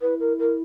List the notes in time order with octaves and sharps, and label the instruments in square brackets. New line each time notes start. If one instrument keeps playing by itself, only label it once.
[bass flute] E4 [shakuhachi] B4
[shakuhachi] A#4
A#4